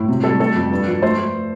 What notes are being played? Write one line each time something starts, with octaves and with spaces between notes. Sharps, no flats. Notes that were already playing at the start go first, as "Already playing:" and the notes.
Already playing: A2
C3
G3 A4
A3 A4
F2
G2
F3
A3 C5
A3